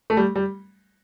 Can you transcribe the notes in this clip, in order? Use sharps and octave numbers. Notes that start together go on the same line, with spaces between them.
A3
G3
G3